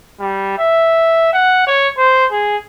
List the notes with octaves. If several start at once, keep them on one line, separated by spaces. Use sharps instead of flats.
G3
E5
F#5
C#5
C5
G#4